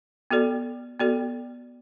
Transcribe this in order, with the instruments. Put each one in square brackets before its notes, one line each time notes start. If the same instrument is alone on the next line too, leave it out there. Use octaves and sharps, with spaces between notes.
[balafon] B3 F#4 A4 D5
B3 F#4 A4 D5